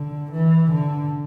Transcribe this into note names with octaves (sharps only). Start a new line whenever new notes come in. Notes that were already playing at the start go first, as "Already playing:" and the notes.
Already playing: D3
E3
D3